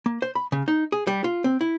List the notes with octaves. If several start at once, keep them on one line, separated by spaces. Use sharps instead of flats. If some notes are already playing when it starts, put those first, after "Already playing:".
A#3
C5
B5
C#3
D#4
G#4
G3
F4
C4
E4